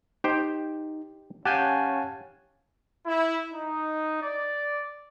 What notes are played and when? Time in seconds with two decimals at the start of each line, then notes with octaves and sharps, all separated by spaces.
0.24 D#4 G4 C5 G5
1.45 C#4 G4 F5 F#5 G#5 A5 F#6 G6
3.06 E4
3.54 D#4
4.23 D5